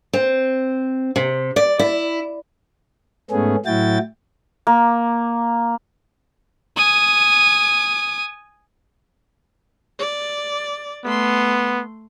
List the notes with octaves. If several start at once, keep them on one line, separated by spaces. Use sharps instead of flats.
C4
C3
D5
E4
G#2 A3 B3 C#4 G#4
A2 F#3 E4 F#4 G5 A6
A#3
G#5 D#6
D5
A3 B3 C6